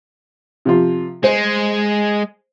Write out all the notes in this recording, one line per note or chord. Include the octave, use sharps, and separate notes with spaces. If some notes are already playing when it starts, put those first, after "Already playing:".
C3 F3 F4
G#3 C5